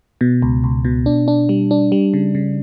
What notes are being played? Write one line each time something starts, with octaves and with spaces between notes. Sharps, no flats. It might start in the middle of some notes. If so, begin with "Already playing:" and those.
B2
C#2
C#2
B2
D4
D4
G3
D4
G3
C#3
C#3